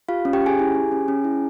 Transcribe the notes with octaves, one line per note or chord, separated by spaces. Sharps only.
F4 G4 F5
C#4
G4 G5
C#4 G#4 G#5
E4
G4
C#4
C#4
E4